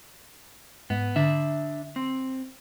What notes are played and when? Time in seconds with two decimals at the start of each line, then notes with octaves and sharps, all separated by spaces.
0.90 G#2 B3
1.16 D3 D4 E5
1.96 C4